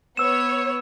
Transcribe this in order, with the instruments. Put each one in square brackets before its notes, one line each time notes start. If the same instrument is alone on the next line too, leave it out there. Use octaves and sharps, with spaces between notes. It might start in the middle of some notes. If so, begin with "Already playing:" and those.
[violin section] B3 C#5 [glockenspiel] E6 E7